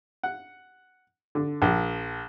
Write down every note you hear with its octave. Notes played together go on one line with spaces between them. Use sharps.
F#5
D3
A#1